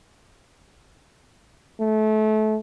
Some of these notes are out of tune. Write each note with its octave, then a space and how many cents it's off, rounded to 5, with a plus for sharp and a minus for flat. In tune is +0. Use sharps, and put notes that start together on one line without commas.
A3 -25